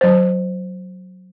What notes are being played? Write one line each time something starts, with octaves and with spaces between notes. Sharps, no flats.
F#3 C5